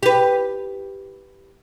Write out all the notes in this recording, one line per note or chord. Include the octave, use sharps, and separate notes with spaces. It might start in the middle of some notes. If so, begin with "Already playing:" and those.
G4 B4